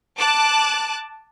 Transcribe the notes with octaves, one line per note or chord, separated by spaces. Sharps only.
A5 D6 F#6